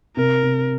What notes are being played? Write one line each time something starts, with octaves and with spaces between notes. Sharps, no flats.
C3 A#4
C3